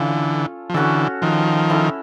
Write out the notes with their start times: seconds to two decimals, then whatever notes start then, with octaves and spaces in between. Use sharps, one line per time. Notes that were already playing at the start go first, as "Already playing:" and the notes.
Already playing: D3 E3 C#4 F4 A4
0.70 F3
0.74 D3 E3 C#4 F#4 A4
1.22 D#3 F3
1.70 C#4 E4 A4